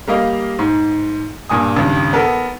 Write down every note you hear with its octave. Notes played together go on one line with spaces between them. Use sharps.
G3 A#3 D#5 F5
G#2
G2 A#2 G#5 D#6
G#1 C#2 G2
B3 A4 A#4